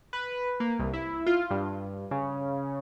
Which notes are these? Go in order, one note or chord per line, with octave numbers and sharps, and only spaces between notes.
B4
A#3
C2
E4
F4
G2
C#3